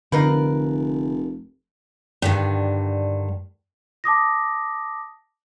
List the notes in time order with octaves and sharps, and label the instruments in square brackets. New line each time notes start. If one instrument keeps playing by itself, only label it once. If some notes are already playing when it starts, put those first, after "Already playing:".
[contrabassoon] F1 [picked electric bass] D3 [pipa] D#4 F4 B4 [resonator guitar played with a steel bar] A#4
[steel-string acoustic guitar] G2 D3 D#3
[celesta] A5 D6 D#6 A#6